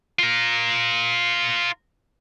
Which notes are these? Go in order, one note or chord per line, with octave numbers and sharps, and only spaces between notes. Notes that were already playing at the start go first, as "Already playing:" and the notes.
F4 A#4